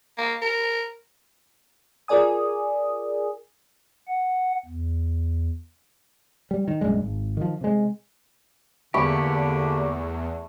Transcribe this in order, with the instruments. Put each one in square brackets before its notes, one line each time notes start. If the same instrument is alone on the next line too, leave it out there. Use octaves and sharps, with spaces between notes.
[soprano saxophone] A#3
A#4
[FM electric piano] F4 G#4 A#4 D5 G#5 D#6
[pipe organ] F#5
E2
[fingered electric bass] G3
D#3
A#1 F#2 G3 G#3
G#1
D#3 F3
C3 G#3
[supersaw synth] E2 [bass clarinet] D3 [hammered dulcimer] A3 B5 C#6 [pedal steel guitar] A#3 G4